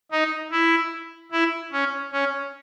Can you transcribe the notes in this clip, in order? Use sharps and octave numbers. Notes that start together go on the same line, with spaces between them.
D#4
E4
E4
C#4
C#4